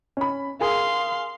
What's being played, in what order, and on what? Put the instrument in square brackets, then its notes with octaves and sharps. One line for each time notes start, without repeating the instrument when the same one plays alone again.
[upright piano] C#4 B5
[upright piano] G#4 A#4 [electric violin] F5 C6